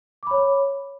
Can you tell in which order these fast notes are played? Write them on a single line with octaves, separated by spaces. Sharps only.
D6 B5 C#5